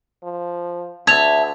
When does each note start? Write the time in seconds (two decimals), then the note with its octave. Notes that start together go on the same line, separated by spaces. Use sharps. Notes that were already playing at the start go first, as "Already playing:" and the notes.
0.24 F3
1.07 D2 E5 A5 G#6 F7